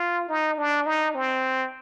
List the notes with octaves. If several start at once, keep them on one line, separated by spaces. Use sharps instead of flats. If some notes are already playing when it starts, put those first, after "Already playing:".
Already playing: F4
D#4
D4
D#4
C4